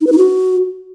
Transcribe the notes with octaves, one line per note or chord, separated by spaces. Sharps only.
D#4
B4
D#4
F#4